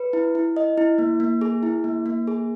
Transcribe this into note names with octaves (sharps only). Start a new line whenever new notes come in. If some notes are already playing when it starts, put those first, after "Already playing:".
Already playing: B4
E4
E4
D#5
E4
A#3
A#3
G#4
E4
A#3
A#3
G#4